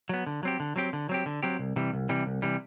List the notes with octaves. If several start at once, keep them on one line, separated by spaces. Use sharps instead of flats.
F#3 B3
D3
F#3 C4 G4
D3
F#3 C4 G4
D3
F#3 C4 G4
D3
F#3 C4 G4
C2
C3 E3 G3
C2
C3 E3 G3
C2
C3 E3 G3